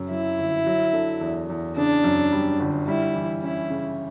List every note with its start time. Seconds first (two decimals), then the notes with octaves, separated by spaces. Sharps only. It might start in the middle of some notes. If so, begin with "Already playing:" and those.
Already playing: F#2 C#3
0.10 F#3 E4
0.38 G1
0.66 F#3
0.93 D3
1.21 E2
1.50 E2
1.77 C#3 D4
2.04 F#2
2.32 G3
2.60 G1
2.88 G3 E4
3.15 E3
3.43 C#4 E4
3.70 C#3